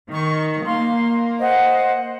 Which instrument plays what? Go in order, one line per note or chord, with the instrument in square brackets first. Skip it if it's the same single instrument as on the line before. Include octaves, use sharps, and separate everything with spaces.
[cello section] D#3 [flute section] C#6
[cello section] A#3 [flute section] F5 C6
[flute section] C5 D#5 F#5